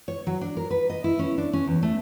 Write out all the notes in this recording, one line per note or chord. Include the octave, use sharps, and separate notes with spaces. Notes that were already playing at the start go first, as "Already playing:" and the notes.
C#5
F#3
D4
A#4
B4
D#5
E4
C#4
D4
C#4
E2
A3